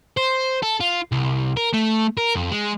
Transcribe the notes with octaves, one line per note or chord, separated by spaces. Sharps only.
C5
A4
F4
C2
A#4
A3
A#4
F2
G#3